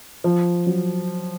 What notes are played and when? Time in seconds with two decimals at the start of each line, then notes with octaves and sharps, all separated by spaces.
0.24 F3
0.67 F#3